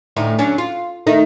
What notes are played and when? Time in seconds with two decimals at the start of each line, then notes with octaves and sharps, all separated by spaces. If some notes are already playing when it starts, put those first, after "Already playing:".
0.16 D2 A2 D#4
0.39 F#3 C#4 D4
0.58 F4
1.07 D#3 A3 D#4